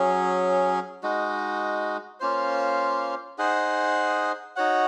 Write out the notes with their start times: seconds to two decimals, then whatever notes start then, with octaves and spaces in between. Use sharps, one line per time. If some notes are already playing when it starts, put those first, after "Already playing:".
Already playing: F#3 C#4 G#4
1.03 G#3 D#4 F#4
2.20 A#3 C#4 F4 C5
3.38 D#4 G#4 C5 F#5
4.56 D#4 F#4 C#5 F#5